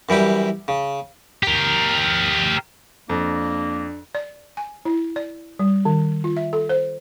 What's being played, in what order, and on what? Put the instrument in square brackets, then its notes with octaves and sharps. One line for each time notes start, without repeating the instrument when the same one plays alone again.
[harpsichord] F#2 E3 G3 G4
C#3
[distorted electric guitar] G4 A#4
[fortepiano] F2 [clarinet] A#3 [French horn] D4
[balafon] D5
G#5
E4
D5
G3
D#3
F4
E5
A4
C5